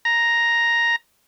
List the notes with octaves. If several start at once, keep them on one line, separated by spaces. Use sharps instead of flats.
A#5